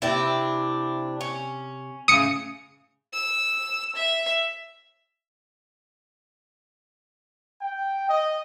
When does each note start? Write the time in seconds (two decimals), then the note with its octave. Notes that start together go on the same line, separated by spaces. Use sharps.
0.02 C3 C4 D4 E4
1.21 C#4
2.08 A2 C#3 D#6 C#7
3.13 E6
3.95 E5
7.59 G5
8.07 D#5